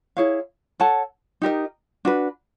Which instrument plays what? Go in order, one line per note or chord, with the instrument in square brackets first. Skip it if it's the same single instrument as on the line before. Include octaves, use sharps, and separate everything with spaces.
[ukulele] E4 G#4 C#5 F5
A4 C#5 F#5 A5
D#4 G4 A#4 D#5
D4 F#4 B4